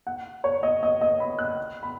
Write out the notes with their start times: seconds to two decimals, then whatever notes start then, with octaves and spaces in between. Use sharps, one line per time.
0.07 F#5
0.44 C#5
0.63 D#5
0.83 D#5
1.01 D#5
1.20 B5
1.39 F#6
1.83 B5